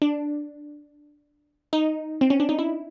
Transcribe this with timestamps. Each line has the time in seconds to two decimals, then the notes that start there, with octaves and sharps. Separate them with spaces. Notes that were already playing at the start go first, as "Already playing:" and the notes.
0.02 D4
1.73 D#4
2.21 C4
2.30 C#4
2.40 D4
2.49 D#4
2.59 E4